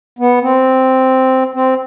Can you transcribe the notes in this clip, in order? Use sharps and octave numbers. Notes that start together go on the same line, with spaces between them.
B3
C4
C4